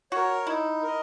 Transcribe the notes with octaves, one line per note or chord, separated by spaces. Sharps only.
F#4 A#4 C#5
D#4 E4
A#4 D#5